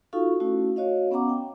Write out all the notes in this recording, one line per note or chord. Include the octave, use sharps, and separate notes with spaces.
D#4 F4 F#4 A4 F5 C#6
A3 C#4 E4 F#4
F#4 C#5 D#5 F5
B3 C#4 F#5 A#5 D6
G5